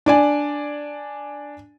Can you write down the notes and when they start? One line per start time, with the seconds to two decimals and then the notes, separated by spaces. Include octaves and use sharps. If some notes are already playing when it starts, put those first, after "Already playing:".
0.06 D4 D5 G#5